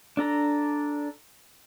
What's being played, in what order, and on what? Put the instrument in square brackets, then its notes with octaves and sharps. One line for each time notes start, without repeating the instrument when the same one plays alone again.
[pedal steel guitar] D4 A4 A#5